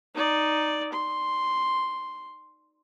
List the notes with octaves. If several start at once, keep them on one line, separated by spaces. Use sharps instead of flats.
D#4 D5
C6